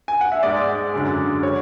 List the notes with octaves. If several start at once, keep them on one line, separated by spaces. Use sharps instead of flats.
G#5
F#5
E5
G#2 G#3 D5
F#2 D3 G#3
C#5